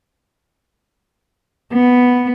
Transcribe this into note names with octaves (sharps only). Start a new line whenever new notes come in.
B3